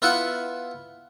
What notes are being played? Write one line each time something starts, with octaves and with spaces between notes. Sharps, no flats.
B3 E4 F4 B4 E5 F#5